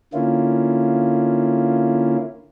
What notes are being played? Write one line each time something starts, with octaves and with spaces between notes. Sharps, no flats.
D3 A#3 C#4 E4 F4